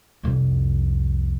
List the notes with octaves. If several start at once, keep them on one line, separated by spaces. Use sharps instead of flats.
C2 F2